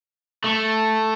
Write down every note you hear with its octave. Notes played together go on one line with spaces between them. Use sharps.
A3